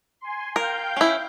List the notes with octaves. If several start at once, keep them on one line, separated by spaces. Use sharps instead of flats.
G#5 C6
A#4 F5 G5 G6
C#4 E4